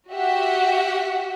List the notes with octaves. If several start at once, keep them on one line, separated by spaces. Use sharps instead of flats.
F#4 G4 E5 F#5